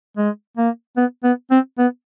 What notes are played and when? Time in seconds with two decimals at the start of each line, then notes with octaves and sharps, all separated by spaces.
0.17 G#3
0.57 A#3
0.97 B3
1.24 B3
1.51 C4
1.78 B3